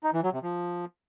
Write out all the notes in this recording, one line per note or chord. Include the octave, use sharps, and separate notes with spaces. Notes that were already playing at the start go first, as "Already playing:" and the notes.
D#4
E3
F#3
C3
F3